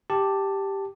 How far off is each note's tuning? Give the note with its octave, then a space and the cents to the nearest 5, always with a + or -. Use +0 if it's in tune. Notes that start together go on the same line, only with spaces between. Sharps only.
G4 +0 A5 +5